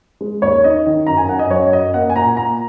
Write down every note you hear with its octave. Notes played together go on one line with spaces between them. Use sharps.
G#3
D#2 C#5
D#4 D#5
D#3
F#2 A#5
G#5
F#2 F#5
D#5
F#3 C#5
F#2 D#5
A#3 F#5
G#5
A#2 A#5
A#3 A#5